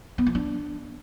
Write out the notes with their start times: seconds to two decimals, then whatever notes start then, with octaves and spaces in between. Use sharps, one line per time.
0.18 B3
0.26 F3
0.35 D4